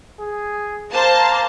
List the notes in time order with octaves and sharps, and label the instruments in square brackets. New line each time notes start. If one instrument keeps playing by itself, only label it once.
[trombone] G#4
[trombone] A#3 [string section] C5 A5 A#5